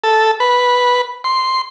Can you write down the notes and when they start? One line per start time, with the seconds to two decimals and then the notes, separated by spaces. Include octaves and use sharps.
0.04 A4
0.40 B4
1.24 C6